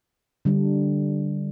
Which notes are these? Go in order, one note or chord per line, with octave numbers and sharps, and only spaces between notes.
D3 G3 D4